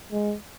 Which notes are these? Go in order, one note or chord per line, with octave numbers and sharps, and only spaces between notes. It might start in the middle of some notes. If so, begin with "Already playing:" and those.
G#3